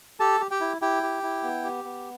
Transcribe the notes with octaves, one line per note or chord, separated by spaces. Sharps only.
G4 A4 A5
G4
G4 G5
E4
E4 G4 G5
G4
E4
B3
G4
B3